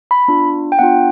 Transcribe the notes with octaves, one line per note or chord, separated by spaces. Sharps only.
B5
B3 D4 F4
G5
B3 D4 F4 F#5